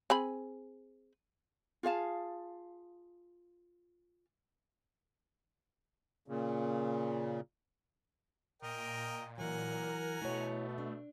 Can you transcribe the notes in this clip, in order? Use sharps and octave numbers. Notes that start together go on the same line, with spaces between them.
C4 G#4 B5
F4 G#4 F5 A5
A#2 C#3
A#2 A#4 D#5 G5
E3 F#3 A#4 F#5 G#5 A#5
B2 A3 E4 C#5
D4